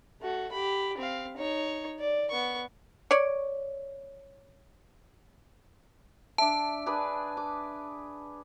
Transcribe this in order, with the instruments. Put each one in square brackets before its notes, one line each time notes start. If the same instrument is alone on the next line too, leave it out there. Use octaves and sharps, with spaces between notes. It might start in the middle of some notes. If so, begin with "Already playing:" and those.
[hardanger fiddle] A3 F#4
G4 B5
C4 F5
D#4 C#5
D5
B3 C#6
[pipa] C#5 D5
[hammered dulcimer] D4 E5 [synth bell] A5
[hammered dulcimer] D4 G#4 B4
D6